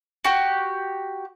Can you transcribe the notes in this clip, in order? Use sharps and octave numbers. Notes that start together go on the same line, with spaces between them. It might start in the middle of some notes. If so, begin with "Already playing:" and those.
F#4 G4